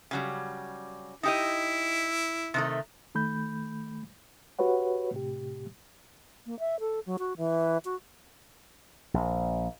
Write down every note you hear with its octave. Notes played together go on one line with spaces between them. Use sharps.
C#3 F#3 G3
D#4 E4 G4 D#5
C3 D#3 A3
D#3 A3 B5 G6
F#4 G4 B4 C#5 F#5
A2 C3 G4
A#3
E5
A4
F#3
F#4
E3
F#4
A#1